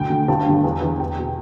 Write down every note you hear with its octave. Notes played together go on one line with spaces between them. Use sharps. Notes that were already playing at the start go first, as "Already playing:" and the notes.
Already playing: D2 G5
D3
G1 A5
G2 D3
E2
E3
E2 G5
B2